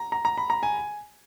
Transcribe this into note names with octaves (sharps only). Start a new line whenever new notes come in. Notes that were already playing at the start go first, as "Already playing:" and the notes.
Already playing: A#5
A#5
A#5
B5
A#5
G#5